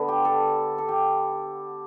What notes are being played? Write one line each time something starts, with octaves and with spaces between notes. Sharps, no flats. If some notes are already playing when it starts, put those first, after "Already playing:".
Already playing: D3 B3
G4
A4
A4
G4